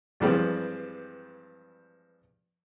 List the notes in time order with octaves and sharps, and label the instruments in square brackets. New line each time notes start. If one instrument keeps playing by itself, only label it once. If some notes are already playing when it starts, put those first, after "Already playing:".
[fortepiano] G2 E3 F3 G3 G#3 C4